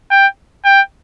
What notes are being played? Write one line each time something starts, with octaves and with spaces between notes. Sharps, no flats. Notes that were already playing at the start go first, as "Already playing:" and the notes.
G5
G5